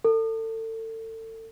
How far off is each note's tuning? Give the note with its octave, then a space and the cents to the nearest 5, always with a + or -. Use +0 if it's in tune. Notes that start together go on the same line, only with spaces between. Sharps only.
A4 +30